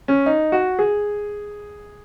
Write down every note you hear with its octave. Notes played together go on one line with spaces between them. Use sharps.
C#4
D#4
F#4
G#4